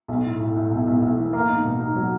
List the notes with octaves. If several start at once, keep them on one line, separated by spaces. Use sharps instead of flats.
B1
A2
A2
A2
B1
B1
B1
E3
A#3
D#4
B2
D#4
F#3